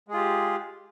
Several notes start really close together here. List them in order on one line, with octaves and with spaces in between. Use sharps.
G#3 G#4 F4 G4